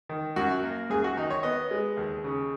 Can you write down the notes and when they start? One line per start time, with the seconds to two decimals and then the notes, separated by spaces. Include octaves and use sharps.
0.09 D#3
0.36 F#2 F#4
0.63 A#3
0.90 F#2 G#4
1.04 F#4
1.17 D#3 D#4
1.30 C#5
1.43 B3 D#5
1.71 G#3
1.97 D#2
2.24 C#3